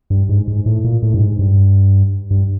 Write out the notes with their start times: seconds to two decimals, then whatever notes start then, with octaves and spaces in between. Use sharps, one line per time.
0.10 G2
0.29 G#2
0.48 G#2
0.66 A2
0.84 A#2
1.03 A2
1.14 G2
1.21 G#2
1.39 G2
2.31 G2